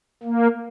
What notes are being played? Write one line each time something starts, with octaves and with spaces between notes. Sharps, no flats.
A#3